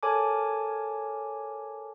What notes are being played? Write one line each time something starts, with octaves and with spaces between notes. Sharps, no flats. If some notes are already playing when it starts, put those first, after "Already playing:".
A4 A#4 C#5 G#5 A5 D6